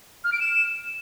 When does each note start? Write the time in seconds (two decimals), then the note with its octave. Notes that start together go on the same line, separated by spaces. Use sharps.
0.24 F6
0.32 D7
0.40 E7